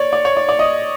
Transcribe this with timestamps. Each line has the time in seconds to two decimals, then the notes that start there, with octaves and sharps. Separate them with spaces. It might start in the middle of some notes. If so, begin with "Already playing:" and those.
Already playing: C#5 D5
0.13 D5
0.25 C#5
0.37 D5
0.49 D5
0.59 D#5